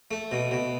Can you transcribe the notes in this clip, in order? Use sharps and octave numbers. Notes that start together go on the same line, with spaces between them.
A3
B2
B2